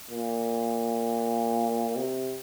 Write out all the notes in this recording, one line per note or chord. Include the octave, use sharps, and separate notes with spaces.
A#2
C3